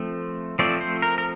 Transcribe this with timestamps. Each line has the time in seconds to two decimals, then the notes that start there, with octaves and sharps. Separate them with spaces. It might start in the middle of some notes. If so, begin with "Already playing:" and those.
Already playing: F3 A3 C4
0.59 F3 A3 C4 D5
0.81 C5
1.02 A#4
1.18 A#4